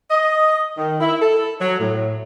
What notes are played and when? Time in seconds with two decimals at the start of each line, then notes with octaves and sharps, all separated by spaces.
0.11 D#5
0.77 D#3
1.00 E4
1.22 A4
1.60 F#3
1.79 A2